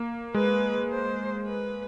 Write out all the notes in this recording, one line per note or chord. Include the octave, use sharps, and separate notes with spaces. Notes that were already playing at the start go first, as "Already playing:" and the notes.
Already playing: A#3
G#3 B4
C5
B4